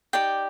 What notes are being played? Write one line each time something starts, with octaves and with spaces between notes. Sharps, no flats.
D#4 G4 D5 G5